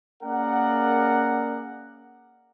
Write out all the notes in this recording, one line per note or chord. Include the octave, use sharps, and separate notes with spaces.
A#3 C#4 G#4 A#4 D5 F#5